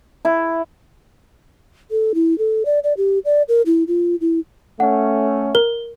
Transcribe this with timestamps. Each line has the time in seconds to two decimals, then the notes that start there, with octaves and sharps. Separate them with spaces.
0.25 E4
1.91 A4
2.15 E4
2.38 A4
2.65 D5
2.84 D5
2.97 G4
3.25 D5
3.48 A#4
3.66 E4
3.88 F4
4.21 E4
4.80 A3 C#4 F#5
5.55 A#4 G7